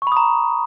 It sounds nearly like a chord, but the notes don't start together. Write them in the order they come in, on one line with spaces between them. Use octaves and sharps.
C#6 B5 D#6 A#5